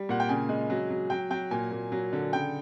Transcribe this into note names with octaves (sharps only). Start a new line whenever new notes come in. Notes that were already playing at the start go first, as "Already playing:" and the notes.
Already playing: G3
A#2 F#5
G5
C#3 G#5
G#3
F#3
F#3
F#3 G5
F#3 G5
A#2 G#5
A#2
F#3
D3
C#3 G5